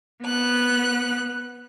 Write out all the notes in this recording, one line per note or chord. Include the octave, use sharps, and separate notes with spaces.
B3 F#6